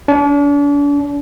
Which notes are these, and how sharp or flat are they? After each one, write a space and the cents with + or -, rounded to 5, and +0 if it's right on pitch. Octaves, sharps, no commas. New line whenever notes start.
D4 -40